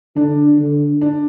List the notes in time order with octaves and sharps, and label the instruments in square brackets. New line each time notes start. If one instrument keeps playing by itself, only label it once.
[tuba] D3 [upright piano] D4
[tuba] D3
[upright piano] D4